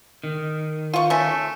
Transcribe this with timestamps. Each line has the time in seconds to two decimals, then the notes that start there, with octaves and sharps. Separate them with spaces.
0.24 D#3
0.94 F4 C#6
1.10 A3 C#4